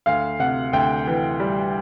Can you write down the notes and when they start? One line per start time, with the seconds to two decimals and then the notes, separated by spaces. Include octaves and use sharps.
0.06 D2 F5
0.39 C3 F#5
0.73 D2 G5
1.07 E3
1.40 G3